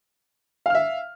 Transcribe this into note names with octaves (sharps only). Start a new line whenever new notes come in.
E5 F5 F6